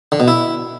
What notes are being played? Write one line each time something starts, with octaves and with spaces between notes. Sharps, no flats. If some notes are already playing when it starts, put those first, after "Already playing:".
D3
B2
E4